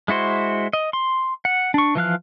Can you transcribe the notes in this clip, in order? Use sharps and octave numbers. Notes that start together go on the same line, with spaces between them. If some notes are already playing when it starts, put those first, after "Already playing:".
G#3 E4 F#4 C5
D#5
C6
F#5
D4 C#6
E3 F3 F5 F#6